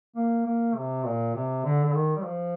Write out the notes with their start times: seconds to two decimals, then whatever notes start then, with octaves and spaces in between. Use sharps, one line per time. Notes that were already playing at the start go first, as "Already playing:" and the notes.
0.16 A#3
0.45 A#3
0.75 C3
1.05 A#2
1.34 C3
1.64 D3
1.84 D3
1.94 D#3
2.16 G3
2.24 F3